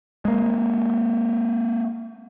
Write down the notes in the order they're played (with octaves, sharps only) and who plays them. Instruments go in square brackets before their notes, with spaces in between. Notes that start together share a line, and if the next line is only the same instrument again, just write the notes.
[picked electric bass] G#3 A#3